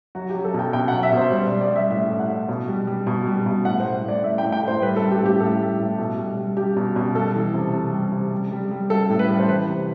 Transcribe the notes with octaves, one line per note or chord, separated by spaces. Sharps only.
F#3 F#4
G4
F#3
A4
B2 G5
B2 G5
F#3 F#5
E5
B2 C5
G3 C5
D5
G3
D5
G3
E5
A2 E5
A2
F#5
A2
B2
G3
G3
B2
G3
B2
A2 F#5
G3 C5
A2 D5
A2 E5
A2 G5
G5
A2
C5
G3 B4
A4
G3
G4
A2
G4
A2 A4
G3
A2
B2
G3
G3
G3 G4
B2
B2
G3 A4
E3
C3
C3
G3
C3
G3
G3
G3
G3 A4
A2
B4
G3
C5
E3 B4
C3